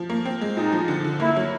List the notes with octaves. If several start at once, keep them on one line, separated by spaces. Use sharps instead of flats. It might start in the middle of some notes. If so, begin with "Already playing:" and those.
Already playing: F3
A#3
C4
G#3
A#2 D#4
F3
D3
D3
A#3 E4
F#3